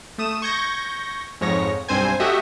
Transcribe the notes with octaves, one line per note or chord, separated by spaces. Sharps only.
A3 D#6 E7
C#6 G6 G#6 A#6
F2 G#2 C#5 A#6
B1 G2 C4 C5 G#5
A3 F#4 G4 D#5 E5